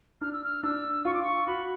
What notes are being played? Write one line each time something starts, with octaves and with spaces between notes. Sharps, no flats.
D4 F6
E6
F6
D4 E6
F4 C#6
D6
C#6
F#4 B5